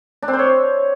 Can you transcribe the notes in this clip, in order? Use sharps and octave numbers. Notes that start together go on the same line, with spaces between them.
D4
C4
C5
C#5